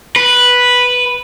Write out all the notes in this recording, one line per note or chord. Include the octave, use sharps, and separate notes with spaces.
B4